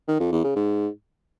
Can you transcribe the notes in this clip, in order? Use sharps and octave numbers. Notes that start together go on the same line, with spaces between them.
D#3
F2
E2
C#3
G#2